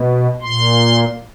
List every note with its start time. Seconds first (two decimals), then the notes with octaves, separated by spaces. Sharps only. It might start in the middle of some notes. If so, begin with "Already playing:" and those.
Already playing: B2
0.42 A#2 C6